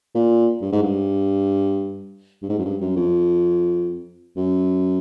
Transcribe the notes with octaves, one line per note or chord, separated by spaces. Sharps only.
A#2
G2
G#2
G2
G2
G#2
F#2
G2
F#2
F2
F#2